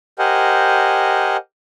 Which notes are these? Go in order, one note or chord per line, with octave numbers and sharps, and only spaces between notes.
G4 A#4 C5 D#5 F#5 G#5